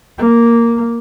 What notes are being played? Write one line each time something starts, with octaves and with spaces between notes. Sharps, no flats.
A#3